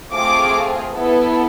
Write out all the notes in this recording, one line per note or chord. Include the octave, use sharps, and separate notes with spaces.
A3 C4 F4 G#4 D6
B3 E4 A4